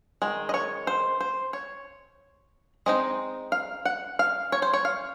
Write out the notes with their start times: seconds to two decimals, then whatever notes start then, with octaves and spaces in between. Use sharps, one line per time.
0.22 D#3 G#3
0.49 D#5
0.54 C#5
0.87 C5
1.20 C5
1.53 C#5
2.86 G#3 C4 D#4 D#5
3.52 F5
3.85 F#5
4.19 F5
4.52 C#5
4.62 C5
4.73 C#5
4.85 F5